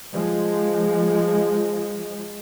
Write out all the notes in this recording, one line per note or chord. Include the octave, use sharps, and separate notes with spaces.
F3 G#3